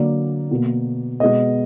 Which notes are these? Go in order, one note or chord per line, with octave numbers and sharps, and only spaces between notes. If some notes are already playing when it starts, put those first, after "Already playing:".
Already playing: D3 F#3 A#3 D5
B2 A#3
B2 G#3 B3 D#5